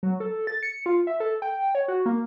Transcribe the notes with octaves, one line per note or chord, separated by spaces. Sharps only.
F#3
A4
A6
C#7
F4
E5
A4
G5
C#5
F#4
A#3